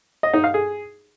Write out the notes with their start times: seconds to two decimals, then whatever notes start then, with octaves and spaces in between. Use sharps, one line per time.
0.23 D#5
0.34 D#4
0.44 F5
0.54 G#4